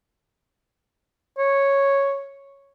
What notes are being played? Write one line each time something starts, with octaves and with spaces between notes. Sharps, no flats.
C#5